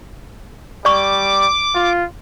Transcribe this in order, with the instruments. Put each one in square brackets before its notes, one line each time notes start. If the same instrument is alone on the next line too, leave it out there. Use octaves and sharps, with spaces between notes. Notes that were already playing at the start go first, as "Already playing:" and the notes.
[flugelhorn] G3 [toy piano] D5 C#6 [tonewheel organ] D6
[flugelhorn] F4